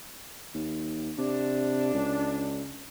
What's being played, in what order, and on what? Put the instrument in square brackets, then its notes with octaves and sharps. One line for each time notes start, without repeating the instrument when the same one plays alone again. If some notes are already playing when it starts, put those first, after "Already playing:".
[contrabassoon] D#2
[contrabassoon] C3 [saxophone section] D4
[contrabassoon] C#2